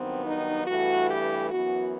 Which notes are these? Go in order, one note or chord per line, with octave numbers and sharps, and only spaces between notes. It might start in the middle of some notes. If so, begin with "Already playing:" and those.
Already playing: G2 D#3 F#3 B3 C4
D#4
G2 E3 A3 F#4
G4
F#2 E3 B3 F#4